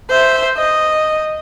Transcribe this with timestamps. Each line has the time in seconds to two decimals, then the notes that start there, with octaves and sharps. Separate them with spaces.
0.10 C5 E5
0.57 D#5